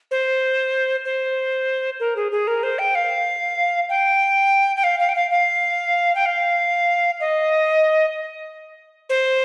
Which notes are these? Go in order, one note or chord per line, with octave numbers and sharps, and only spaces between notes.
C5
C5
A#4
G#4
G#4
A#4
C5
G5
F5
G5
G5
F5
F5
G5
F5
F5
G5
F5
D#5
C5